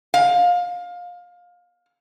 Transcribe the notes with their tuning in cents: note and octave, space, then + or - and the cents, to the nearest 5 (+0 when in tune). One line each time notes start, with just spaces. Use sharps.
F5 +25